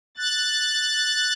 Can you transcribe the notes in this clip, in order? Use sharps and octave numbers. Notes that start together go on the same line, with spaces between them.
F#6 A6